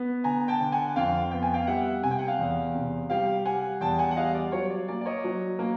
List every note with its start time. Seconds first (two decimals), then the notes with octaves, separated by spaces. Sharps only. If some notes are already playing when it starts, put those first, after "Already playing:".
Already playing: B3
0.24 D3 G#5 A#5
0.48 G5 A5
0.60 D3
0.72 F#5 G#5
0.96 F2 F5 G5
1.31 B3 G5
1.43 G#5
1.54 F5 G5
1.67 G3 E5 F#5
2.02 C3 G#5
2.11 G5
2.19 F#5
2.27 F5 G5
2.38 E2
2.75 C3
3.10 G3 F5 G5
3.45 G3 F#5 G#5
3.81 E2 G5 A5
3.99 F#5 G#5
4.11 F#5
4.16 G3 D#5 F5
4.34 D5
4.52 F#3 C#5
4.70 D5
4.88 A#3 D5
5.01 D5
5.05 C#5 D#5
5.24 F#3
5.59 A#3